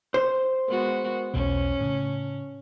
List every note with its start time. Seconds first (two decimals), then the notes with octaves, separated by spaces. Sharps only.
0.14 C5
0.68 G#3 B3 F#4 A#4
1.34 B1 E2 B2 C#4
1.80 A2 C#3